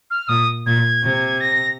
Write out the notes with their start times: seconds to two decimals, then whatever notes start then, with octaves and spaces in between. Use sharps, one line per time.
0.11 F6
0.28 A#2 D#6
0.66 A#2 G#6
1.03 C3
1.40 A#6